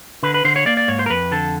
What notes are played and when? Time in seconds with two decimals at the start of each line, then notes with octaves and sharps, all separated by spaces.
0.23 D3 B4
0.34 B4
0.45 D3 C5
0.56 C#5
0.66 A#3 D5
0.77 D5
0.88 G#2 C#5
0.99 C5
1.06 A#4
1.10 F2 B4
1.32 D3 A4